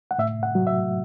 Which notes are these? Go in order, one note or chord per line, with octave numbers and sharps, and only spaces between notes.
F#5
A2 E5
F#5
F#3
E5